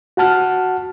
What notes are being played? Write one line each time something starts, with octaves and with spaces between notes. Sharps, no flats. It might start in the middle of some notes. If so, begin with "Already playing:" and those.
F#4 F#5 A5 F6